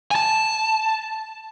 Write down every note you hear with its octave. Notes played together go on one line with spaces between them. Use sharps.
G#5 A5